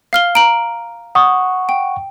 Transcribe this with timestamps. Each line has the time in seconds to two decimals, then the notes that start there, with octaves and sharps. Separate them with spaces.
0.13 F5 F6 G7
0.35 A#5 D7 F#7
1.15 F#5 C#6 D#6
1.69 G5